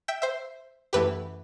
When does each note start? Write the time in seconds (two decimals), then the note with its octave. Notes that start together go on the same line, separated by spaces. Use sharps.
0.08 E5 G5
0.22 C5 E5
0.93 F#2 E3 A3 E4 G4 B4